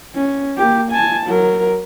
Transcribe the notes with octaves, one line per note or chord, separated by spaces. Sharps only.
C#4
A#3 G4
G#5 A5
F#3 A#4